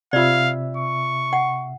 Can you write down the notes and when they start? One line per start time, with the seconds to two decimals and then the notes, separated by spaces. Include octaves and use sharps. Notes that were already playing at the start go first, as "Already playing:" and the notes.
0.13 C3 F4 D5 E5 F5
0.77 C#6
1.33 F#5